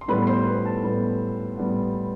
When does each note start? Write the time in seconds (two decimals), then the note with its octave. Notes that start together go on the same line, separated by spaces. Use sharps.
0.01 C6
0.08 A2 G3 B3 B4 B5
0.27 C5 C6
0.46 B4 B5
0.65 A4 A5
0.83 A2 G3 B3 B4 B5
1.58 A2 G3 B3